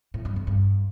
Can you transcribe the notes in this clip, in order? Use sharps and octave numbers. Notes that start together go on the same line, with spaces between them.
A2
G2
F2
G2